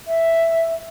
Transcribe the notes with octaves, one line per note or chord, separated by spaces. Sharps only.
E5